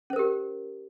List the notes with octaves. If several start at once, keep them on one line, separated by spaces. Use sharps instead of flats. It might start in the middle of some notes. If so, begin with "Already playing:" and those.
C#4 G4 A#4 C5